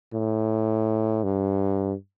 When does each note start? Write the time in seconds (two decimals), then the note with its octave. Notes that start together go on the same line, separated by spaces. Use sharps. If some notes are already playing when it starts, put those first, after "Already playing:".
0.14 A2
1.24 G2